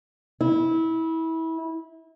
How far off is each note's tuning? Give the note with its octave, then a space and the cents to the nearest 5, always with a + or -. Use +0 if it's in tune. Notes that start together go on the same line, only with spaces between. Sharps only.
E4 -25